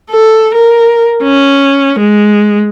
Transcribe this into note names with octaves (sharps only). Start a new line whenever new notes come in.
A4
A#4
C#4
G#3